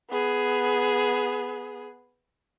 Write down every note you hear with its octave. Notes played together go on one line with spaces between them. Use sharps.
B3 G#4